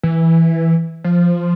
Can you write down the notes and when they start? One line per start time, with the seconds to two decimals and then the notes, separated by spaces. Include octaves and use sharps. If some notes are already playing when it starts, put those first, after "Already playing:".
0.03 E3
1.04 F3